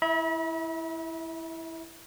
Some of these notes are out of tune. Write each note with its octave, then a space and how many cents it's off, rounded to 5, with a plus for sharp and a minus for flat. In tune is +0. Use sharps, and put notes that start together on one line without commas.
E4 +0 E5 -35 B5 -40